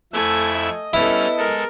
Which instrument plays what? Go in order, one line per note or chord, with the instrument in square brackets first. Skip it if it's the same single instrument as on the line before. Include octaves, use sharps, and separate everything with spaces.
[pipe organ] F2 E4 E5 [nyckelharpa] A3 G#5
[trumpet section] D#5
[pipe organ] G3 C#4 F6 [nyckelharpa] B3 A4 [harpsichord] E4
[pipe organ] G#3 A4 [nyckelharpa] A#4